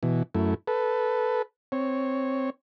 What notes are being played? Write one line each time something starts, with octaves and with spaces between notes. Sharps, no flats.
B2 E3
F#2 A3 E4
A4 B4
C4 C#5